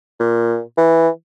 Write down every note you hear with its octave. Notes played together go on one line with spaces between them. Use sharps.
A#2
E3